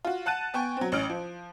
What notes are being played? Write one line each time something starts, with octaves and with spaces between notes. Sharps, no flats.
F4 F#4
F#5 A5 F#6 A6 D#7
B3 G5 G#5 C#6
F#3 C4
A1 C#4 F6 D7
F3